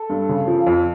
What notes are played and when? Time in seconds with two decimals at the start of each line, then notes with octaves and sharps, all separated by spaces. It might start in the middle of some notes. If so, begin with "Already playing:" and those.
Already playing: A4
0.10 G2
0.29 C#3
0.47 F3
0.67 F2